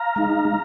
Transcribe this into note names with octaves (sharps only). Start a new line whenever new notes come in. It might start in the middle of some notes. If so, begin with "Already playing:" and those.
Already playing: F5 A#5
G#3 D#4